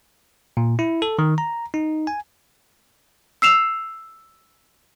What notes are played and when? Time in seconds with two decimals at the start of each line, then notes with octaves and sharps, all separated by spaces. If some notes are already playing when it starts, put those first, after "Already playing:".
0.57 A#2
0.79 E4
1.02 A4
1.19 D#3
1.38 A#5
1.74 D#4
2.07 G#5
3.42 E6 C7 E7 F7